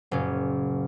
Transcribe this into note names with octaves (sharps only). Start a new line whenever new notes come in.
F#1 A#2 C#4